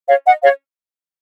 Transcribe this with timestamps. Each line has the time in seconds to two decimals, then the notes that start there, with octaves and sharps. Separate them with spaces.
0.08 C#5 F5
0.26 D#5 F#5
0.42 C#5 F5